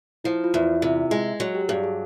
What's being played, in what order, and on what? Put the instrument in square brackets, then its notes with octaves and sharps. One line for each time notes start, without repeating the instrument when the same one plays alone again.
[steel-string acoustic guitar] F3 [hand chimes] E4
[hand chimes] F4
[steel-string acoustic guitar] E2
[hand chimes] E4
[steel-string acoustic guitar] C3 [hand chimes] F4
[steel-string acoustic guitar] G#3
[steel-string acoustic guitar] F#3 [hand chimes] F#4
[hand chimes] G4
[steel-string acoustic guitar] G2 [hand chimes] G#4
[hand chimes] G#4